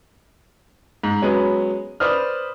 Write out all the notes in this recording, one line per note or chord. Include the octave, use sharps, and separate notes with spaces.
G#2
F#3 G#3 B3 C#4
B4 C5 D5 D#6 F6